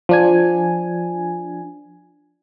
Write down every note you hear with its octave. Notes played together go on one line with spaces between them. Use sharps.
F3 D4 G#5